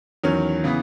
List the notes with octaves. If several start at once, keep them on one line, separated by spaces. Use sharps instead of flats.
E2 D#3 F#3 C#4
C#3 E3 B3